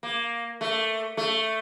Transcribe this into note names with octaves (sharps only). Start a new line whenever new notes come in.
A#3
A3
A3